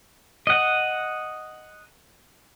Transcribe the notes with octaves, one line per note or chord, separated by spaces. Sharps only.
D#5 F#5